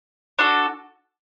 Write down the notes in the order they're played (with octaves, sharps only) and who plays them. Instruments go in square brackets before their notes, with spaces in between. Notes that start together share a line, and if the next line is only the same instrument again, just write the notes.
[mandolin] D4 F#4 A4